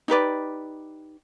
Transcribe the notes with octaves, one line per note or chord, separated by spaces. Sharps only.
D#4 G4 B4 D5